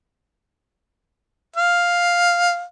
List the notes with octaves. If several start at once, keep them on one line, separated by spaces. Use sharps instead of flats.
F5